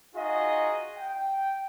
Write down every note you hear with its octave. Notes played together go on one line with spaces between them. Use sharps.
D#4 F4 F#4 G#4 D#5
G5